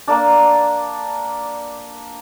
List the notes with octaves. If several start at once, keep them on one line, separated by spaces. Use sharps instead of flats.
A#3 D4